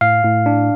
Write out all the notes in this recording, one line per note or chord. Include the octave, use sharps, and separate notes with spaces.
A2 F5
A2
D4